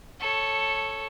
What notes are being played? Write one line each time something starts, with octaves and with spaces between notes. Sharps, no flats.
A4 C#5